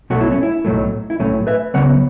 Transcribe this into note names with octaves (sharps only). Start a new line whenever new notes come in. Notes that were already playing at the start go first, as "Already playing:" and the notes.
B1 B2 F#3 A3 F#4
E4
C#4
E4
B1 A2 F#3 A3
E4
B1 A2 F#3 A3 C#4
B4 E5
C#2 C#3 F#3 B3 C#5 F#5